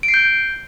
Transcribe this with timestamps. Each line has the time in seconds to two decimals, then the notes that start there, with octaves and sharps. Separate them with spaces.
0.03 D7
0.08 C7
0.14 G6